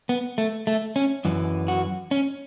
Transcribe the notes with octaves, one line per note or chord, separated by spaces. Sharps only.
B3
A3
A3
C#4
F#2 E3
F#4
C#4